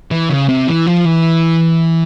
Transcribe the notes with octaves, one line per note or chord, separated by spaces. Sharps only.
E3
C#3
C3
E3
F3
E3